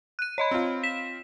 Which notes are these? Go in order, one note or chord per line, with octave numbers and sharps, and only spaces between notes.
F#6 D#7
C#5 D#5 B5
C4 F4
B6 E7